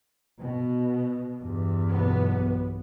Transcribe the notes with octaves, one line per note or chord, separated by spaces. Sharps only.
B2
E2 G2
B1 B3